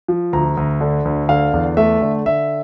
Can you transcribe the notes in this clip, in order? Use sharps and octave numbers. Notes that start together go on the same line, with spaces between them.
F3
D2 A#5
D2
D3
D2
D3 F5
E2
A3 E5
D3
D3 E5